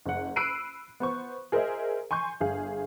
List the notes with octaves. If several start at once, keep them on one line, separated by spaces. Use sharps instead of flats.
F#1 F#5
B5 E6 F#6 C7 D7 D#7
B3 C5 C#6
G#4 A#4 C5 D#5 E5
G#5 C6 C#6 G6
G1 G#4 F5